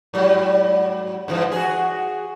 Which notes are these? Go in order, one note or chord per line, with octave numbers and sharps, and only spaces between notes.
G#2 F#3 G3
G2 E3 F3
F#4 G#4